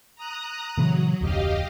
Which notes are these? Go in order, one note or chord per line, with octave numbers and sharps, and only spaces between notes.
A#5 D#6 F#6
A#2 C#3 E3 F#3
F1 D2 G4 D#5 F5